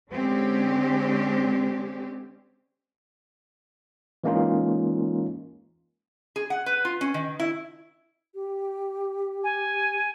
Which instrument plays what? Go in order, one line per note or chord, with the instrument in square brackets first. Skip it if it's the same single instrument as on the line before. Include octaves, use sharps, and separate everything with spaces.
[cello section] D3 G#3 C4 C#4 G4
[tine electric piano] E3 G#3 A#3 C#4 D#4 F4
[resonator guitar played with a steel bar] G#4
F#5
B4
F4
C#4
D#3
E4
[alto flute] G4
[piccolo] G#5